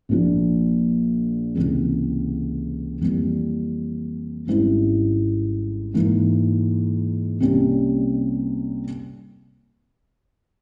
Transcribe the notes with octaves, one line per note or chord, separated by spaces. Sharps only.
A#1 A#2 F3
C#2 C3 E3 A#3
F2 E3 G3 A#3
G#1 G#2 G3 C#4 E4
G#2 E3 A#3 E4
C2 C3 G3 A#3 C#4